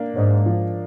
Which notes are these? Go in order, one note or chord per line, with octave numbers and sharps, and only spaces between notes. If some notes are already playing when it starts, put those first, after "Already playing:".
Already playing: A#3 D4
G#2 D4
F3